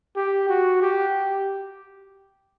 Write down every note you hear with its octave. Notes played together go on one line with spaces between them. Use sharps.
G4
F#4
G4